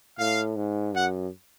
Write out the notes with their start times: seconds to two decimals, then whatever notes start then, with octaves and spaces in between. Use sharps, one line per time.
0.18 A2 F5
0.56 G#2
0.94 F#2 F#5